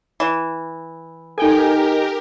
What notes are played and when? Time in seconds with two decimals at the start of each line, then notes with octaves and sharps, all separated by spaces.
0.20 E3
1.38 D#4 G4 A4 A#4 G5 G#5